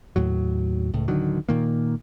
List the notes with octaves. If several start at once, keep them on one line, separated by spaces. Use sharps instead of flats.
D#2 A2 F#3
C#2 A2
D1 D3 D#3 F#3
A#2 D#3 A#3